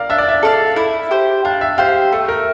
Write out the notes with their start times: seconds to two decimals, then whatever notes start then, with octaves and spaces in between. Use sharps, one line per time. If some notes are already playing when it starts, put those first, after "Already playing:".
Already playing: A#4 D5 F5
0.10 D4 E5
0.18 D5
0.28 E5
0.43 A4 D5 F5
0.76 E4
1.11 G4 C5
1.45 D4 F5
1.61 E5
1.78 G4 C5 F5
2.12 A3
2.28 A#4